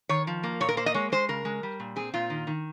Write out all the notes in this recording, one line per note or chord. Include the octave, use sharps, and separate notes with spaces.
D#3 C#5
F3
A#3
A#2 C#5
A#4
A#3 C5
D#5
G#3 C#5
G#3 C5
C#3 A#4
G#3
G3
A#2
C4 G#4
A#2 F4
D#3
D#3